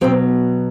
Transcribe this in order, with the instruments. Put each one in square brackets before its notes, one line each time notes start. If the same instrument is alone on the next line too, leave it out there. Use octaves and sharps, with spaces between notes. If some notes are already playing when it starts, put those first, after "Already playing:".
[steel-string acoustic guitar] B2 F#3 C4